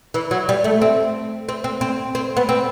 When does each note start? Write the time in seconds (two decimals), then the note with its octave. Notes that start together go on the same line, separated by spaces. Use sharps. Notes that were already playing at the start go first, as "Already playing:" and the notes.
0.14 E3
0.31 F#3
0.49 G3
0.64 A3
0.82 C4
1.49 C4
1.64 C4
1.81 C4
2.15 C4
2.37 B3
2.49 C4